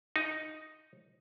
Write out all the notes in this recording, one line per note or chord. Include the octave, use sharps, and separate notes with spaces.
D#4